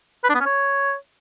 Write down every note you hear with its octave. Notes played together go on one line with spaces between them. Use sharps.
B4
D4
B3
C#4
C#5